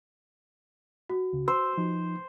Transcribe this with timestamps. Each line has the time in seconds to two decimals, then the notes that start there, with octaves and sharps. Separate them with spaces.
1.10 F#4
1.33 C#2 C#3
1.48 C5 E6
1.78 F3 D#4